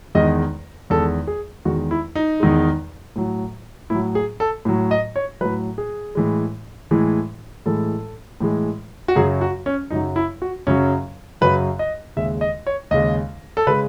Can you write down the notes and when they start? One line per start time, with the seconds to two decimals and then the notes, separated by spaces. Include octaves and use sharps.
0.15 E2 D#3 G#3 D#5
0.90 E2 D#3 G#3 A4
1.27 G#4
1.65 E2 D#3 G#3 F#4
1.91 E4
2.15 D#4
2.40 E2 D#3 G#3
3.16 A2 F#3
3.90 A2 F#3 E4
4.15 G#4
4.40 A4
4.65 A2 F#3
4.91 D#5
5.16 C#5
5.41 A2 F#3 B4
5.78 G#4
6.15 A2 E3 G#3
6.91 A2 E3 G#3
7.66 A2 E3 G#3 A4
8.41 A2 E3 G#3
9.08 F#4
9.15 F#2 C#3 F#3 G#4
9.41 F#4
9.66 C#4
9.90 F#2 C#3 F#3 D#4
10.16 E4
10.42 F#4
10.67 F#2 C#3 F#3 C#4
11.41 F#2 C#3 F#3 B4
11.79 D#5
12.16 D#2 C#3 G#3 E5
12.41 D#5
12.67 C#5
12.91 D#2 C#3 G#3 D#5
13.57 A4
13.67 C#3 G#3 B4